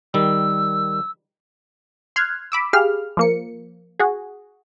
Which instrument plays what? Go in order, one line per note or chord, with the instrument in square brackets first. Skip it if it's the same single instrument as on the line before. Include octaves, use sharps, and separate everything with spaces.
[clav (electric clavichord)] D#3 G3 [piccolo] E6
[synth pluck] C6 F6 F#6 G#6
B5 D6 E6
G4 G#4 F5 F6
F3 A#3 C#7
F#4 G#4